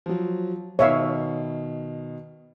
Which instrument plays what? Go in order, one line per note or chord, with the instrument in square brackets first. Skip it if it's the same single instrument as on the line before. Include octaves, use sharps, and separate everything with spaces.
[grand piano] F3 F#3
[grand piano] B2 D#3 [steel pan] C#5 E5 F5